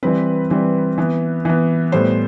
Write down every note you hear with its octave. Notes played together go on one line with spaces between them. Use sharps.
E3 G3 C4 B4
E3 G3 C4
E3 B3
E3 B3
A2 G3 B3 C5